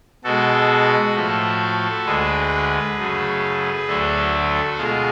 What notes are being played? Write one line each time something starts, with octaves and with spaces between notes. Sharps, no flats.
B2 G#3 F#4 A4
A2 F3 A3
D2 D3 G#3 G#4 B4
F#2 C#3 F#3 A3
D2 D3 F#3 A3 F#4 A4
B2 G#3 F4 G#4